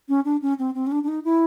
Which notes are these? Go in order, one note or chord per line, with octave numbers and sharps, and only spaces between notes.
C#4
D4
C#4
C4
C4
C#4
D4
D4
D#4
E4